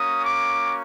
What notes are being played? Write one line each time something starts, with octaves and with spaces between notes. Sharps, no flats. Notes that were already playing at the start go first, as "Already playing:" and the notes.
Already playing: A#3 C#4 F#4 D#6
D6